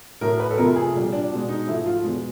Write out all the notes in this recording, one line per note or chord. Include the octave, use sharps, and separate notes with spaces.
A2 F#3 A3 A#4
B4
A4
F2 C3 F3 A3 A#4
G#4
A#2 G3
D4
B2 G#3
D#4
G#2 F3 A3 E4
F4
E2 B2 G#3